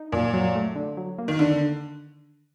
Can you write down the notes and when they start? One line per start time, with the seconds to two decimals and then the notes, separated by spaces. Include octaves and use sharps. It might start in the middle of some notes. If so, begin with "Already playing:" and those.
Already playing: D#4
0.12 F#2 A#2
0.33 F#3
0.55 A3
0.76 D3
0.97 F#3
1.18 A#3
1.28 D#3
1.39 D3